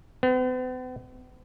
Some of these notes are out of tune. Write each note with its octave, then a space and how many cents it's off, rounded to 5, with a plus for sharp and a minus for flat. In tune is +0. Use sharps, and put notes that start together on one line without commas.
B3 +45